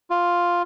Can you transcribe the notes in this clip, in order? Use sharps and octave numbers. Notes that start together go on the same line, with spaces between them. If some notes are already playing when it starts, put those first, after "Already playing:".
F4